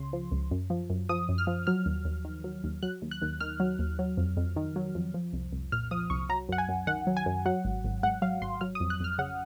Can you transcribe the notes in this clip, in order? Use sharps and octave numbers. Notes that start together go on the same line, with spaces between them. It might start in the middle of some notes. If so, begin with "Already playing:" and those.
Already playing: C#2 C#3 C6
F3
C#2
F#2
F3
F#2
F3 D#6
F#2
F6
F3
F#3 F6
D#2
D#2
D#3
F#3
D#2
F#3 F#6
D#2
F#6
D#2
D#3 F6
F#3
D#2
F#3
F2
F2
D#3
F#3
F2
F3
C2
C2
A#2 F6
F3 D#6
C2 C#6
F#3 A#5
F#2 F#5
G#5
F#2
D#3 F#5
F#3
G#5
F#2
F#3 F#5
G#1
G#1
G#2 F#5
F#3 F5
G#1 C6
F#3 F6
D#6
F2
F#6
F2 F6
C#3 F#5